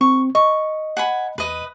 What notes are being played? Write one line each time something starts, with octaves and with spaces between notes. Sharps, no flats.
C4 C#6
D#5 C#6
F#5 G#5 B5
E2 B4 D#5